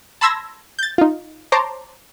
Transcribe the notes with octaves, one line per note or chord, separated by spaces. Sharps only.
A5 B5 C6 E6 G#6 A#6
G6 A6
D#4 F4
C5 C#5 A5 A#5 C6 D6